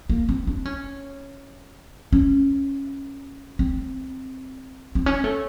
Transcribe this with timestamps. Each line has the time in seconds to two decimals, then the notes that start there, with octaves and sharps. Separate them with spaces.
0.09 A#3
0.29 C4
0.47 D4
0.65 C#4
2.13 C#4
3.59 C4
4.95 C4
5.06 C#4
5.24 A3